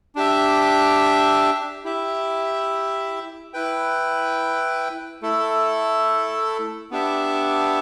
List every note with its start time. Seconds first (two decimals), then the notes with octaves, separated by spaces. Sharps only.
0.16 D4 G4 E5
1.84 E4 G4 E5
3.53 E4 B4 G5
5.22 A3 E4 A4
6.91 B3 D4 G4 E5